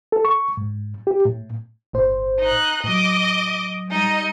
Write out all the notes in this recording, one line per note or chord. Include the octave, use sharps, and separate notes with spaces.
A4
C#6
G#2
G4
A2
G1 A2 C5
D#4 F#6
A2 F#3 D#5 D6
G3 D#4 D#5